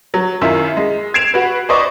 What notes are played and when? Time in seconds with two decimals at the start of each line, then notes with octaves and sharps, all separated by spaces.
0.14 F#3
0.41 F#2 D#3 E4 F4
0.77 G#3
1.14 G#6 C7 D7 E7 F7
1.34 F#4 B4
1.69 B4 C5 D5 D#5 C#6 D6